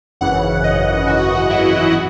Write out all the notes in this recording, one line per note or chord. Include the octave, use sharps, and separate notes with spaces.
G#1 F#2 C#3 E3 F#5
D#5
G#1 F#2 C#3 E3 F#4
E4
B2 F#4